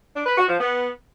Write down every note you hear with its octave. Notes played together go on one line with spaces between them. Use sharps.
D4
B4
F#4
F3
B3